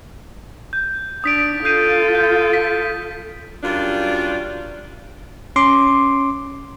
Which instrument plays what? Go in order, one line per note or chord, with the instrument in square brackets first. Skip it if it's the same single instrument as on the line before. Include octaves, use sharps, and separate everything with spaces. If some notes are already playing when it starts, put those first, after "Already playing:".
[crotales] G6
[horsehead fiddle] D4 [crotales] D#6 B6 D7
[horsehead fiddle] F4 A4 [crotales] G6 C7 D#7
[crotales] G6
B6
[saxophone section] F#2 G3 D4 F4
[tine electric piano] C#4 C6 D6